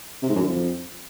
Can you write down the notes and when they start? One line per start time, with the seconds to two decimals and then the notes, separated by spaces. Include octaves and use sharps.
0.22 C3
0.29 G#2
0.35 F#2
0.42 D3
0.48 F2